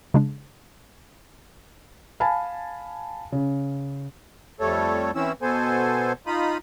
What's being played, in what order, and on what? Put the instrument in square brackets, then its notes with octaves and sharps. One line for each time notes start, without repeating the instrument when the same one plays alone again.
[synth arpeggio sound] C#3 G#3 D4
[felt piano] F5 G#5 A5 B5
C#3
[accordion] F2 G3 A3 A4 C#5
E3 C4 C#4 E4 E6
B2 B3 A4 C5 G#5
D#4 F4 B5 D#6